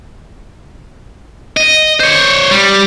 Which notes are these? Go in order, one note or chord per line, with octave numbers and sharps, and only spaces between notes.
D#5
C5 C#5
G3